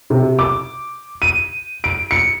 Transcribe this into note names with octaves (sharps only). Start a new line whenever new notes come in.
C3
D6
D#7
D7
C#7